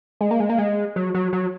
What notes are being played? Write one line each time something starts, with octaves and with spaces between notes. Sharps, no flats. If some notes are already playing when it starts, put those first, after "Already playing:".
G#3
A#3
G#3
A#3
G#3
F#3
F#3
F#3